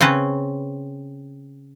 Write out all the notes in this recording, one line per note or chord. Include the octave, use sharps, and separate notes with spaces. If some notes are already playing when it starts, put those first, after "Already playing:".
C#3 C4 C#4 B4